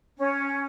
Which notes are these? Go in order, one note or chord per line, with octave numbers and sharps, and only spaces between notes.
C#4